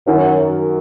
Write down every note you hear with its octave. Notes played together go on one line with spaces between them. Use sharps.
F#2 D#3
F#2